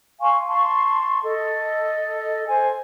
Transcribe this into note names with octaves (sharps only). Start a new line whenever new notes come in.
F5 G#5 C6 C#6
A5 C6 C#6
A4 D#5
C5 G#5